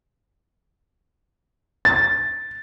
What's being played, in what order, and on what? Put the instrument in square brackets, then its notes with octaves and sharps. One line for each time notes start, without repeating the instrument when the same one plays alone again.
[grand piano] A6